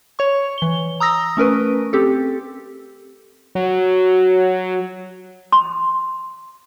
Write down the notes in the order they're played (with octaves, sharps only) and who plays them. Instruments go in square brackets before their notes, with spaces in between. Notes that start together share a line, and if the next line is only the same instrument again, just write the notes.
[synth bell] C#5 C#6
E3 G7
A#5 D#6 E6 A#6
A3 C#4 A#4 B4
C4 G4 A4
[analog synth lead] F#3
[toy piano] C6